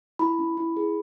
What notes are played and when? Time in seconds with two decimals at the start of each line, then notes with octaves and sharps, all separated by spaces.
0.19 E4 B5
0.39 C#4
0.57 E4
0.77 G#4